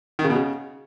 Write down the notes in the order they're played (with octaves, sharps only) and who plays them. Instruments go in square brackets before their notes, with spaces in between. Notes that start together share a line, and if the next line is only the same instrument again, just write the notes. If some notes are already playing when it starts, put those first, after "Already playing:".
[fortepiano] D#3
C#3
B2
C#3